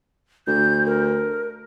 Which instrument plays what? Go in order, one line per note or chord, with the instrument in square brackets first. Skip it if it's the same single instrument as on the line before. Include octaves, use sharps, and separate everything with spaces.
[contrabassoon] D2 [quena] G6
[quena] A#4